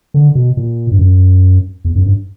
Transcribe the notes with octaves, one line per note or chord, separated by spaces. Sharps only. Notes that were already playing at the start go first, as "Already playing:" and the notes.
D3
B2
A#2
G2
F#2
E2
F#2
G2